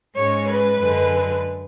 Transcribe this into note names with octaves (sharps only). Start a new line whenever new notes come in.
G#2 G#3 C#4 C#5
B4
F#2 D3 G#3